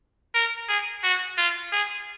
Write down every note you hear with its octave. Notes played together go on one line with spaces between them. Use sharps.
A#4
G#4
F#4
F4
G#4